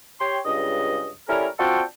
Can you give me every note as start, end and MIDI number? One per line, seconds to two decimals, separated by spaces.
0.20 0.39 67
0.20 0.39 73
0.20 0.39 79
0.20 0.39 84
0.46 1.09 37
0.46 1.09 43
0.46 1.09 75
1.29 1.47 55
1.29 1.47 61
1.29 1.47 64
1.29 1.47 69
1.29 1.47 70
1.59 1.82 60
1.59 1.82 62
1.59 1.82 65
1.59 1.82 66
1.59 1.82 69
1.59 1.82 79